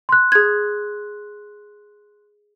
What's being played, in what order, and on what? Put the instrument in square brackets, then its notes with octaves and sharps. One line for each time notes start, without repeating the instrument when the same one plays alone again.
[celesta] C6 F#6
[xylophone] G#4 G#6